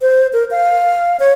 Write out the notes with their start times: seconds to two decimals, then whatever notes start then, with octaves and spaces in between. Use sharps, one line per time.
0.01 C5
0.33 A#4
0.51 F5
1.20 C#5